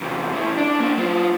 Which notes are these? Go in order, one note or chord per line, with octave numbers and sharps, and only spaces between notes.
E2 C3
A2 E3
D4 D5
A#3 D4
F#3 F4